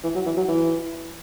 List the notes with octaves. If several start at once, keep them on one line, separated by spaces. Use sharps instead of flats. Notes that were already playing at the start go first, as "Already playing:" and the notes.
E3
F#3
E3
F#3
E3